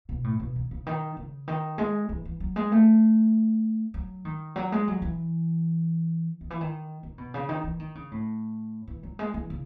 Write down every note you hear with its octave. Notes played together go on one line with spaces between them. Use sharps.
B2
A2
B2
D#3
C#3
D#3
C#3
D#3
G#3
E3
E3
F#3
G#3
A3
F#3
D#3
F#3
G#3
F#3
E3
D#3
E3
D#3
D#3
B2
C#3
D#3
E3
D#3
C#3
A2
E3
F#3
G#3
E3
C#3